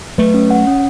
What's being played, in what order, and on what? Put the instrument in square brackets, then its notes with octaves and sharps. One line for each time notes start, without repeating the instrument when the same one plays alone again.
[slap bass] F#3 A3 [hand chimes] B4
[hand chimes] C#4
F#5
C#4